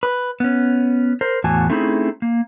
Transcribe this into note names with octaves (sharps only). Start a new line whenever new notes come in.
B4
B3 C#4
A#4 C5
E2 A2 E3 F#4 G#5 A5
A3 C4 C#4 D#4 E4 G#4
A#3